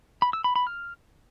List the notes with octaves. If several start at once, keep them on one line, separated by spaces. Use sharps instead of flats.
B5
E6
B5
B5
F6